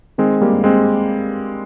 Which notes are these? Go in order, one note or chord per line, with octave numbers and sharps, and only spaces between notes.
D#3 G#3 C4
G3 A#3
G2
G#3 C4